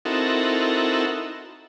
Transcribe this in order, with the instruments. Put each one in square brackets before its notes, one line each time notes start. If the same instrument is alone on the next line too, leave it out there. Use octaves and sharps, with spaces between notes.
[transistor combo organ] C4 D#4 E4 F#4 A4 A#4